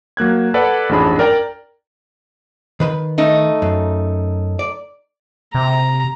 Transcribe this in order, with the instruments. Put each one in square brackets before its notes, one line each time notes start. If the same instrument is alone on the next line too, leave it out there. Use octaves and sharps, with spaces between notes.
[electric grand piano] F#3 A#3 F#6 G#6
A4 B4 D5 F#5
A1 F2 G#2 D4 G#4 B5
A#4 D5 G5 A#5
[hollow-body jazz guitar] D#3 B4 B5
[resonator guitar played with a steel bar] A3 D#4
[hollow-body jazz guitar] F#2
D5
[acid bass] C3 [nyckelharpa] A#5